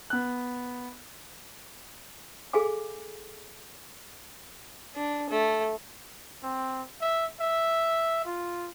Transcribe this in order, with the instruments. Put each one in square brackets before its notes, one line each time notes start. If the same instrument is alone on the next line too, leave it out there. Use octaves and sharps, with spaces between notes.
[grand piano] B3 F#6
[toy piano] G#4 A4 F5 G#5 D6
[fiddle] D4
A3
[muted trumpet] C4
E5
E5
F4